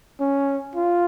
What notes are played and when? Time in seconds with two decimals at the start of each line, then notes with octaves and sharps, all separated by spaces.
0.20 C#4
0.75 F4